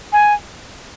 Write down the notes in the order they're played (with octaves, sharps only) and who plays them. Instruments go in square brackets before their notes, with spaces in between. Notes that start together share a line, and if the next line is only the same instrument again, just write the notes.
[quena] G#5